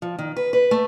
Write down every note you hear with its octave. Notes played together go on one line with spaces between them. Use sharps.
F3
D#3
B4
B4
A3